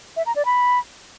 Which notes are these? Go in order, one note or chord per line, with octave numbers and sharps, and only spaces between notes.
E5
A#5
D5
B5